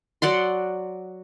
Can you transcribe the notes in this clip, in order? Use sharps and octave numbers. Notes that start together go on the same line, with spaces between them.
F#3 D5 F#5 C6